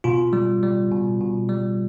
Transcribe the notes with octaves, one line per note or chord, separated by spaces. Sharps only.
B2 F4
G3
G3
B2
B2
G3